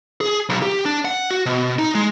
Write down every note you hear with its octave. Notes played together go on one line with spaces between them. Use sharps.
G#4
B1
G4
D4
F#5
F#4
B2
D#4
G#3